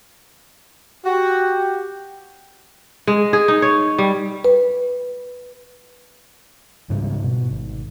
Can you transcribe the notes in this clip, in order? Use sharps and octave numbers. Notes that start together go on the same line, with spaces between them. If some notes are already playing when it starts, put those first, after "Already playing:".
F#4 G4
G#3
G#4
D#4
C#5
G3
B4
G#2 C#3 G3
B2
G#1